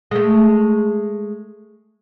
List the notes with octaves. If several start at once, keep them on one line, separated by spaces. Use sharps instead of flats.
G#3 A3